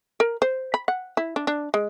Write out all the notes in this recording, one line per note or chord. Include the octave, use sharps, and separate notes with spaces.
A#4
C5
B5
F#5
E4
D4
D4
G#3